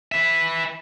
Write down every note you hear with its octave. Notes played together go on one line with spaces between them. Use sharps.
B4 E5